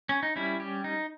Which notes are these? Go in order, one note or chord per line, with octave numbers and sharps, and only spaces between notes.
C#4
D#4
G3 C#4 E4
G4
D#4